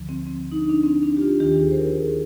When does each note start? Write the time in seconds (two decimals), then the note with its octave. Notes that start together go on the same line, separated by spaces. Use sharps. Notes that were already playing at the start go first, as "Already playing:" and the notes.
Already playing: D2 D3 F3
0.09 C4
0.27 C4
0.52 D#4
0.56 D4
0.70 D4
0.84 C4
1.03 D4
1.17 G4
1.21 F4
1.40 D#2 D#3 G4
1.59 G#4
1.71 C5
1.78 A#4
1.96 G#4